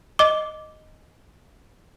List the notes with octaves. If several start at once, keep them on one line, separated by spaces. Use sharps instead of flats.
D#5 D6